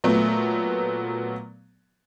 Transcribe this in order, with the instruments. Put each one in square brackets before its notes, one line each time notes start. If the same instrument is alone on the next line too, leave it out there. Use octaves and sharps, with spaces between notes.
[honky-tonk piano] A#2 F#3 A3 B3